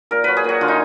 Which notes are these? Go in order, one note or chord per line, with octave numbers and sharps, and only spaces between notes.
A#2 A#4
F#3 B4
G#4
A#2 F#4
D3 F4
D#4